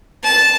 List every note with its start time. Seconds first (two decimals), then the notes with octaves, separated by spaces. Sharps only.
0.24 A5